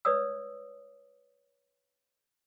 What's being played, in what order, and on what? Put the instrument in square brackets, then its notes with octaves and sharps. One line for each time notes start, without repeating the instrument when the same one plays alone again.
[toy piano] B4 C#5 D5 D#6 E6